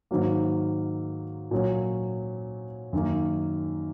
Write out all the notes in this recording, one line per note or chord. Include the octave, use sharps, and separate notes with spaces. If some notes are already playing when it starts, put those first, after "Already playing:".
G#2 D#3 F#3 A#3
A#2 F#3 C#4
F#2 D#3 A#3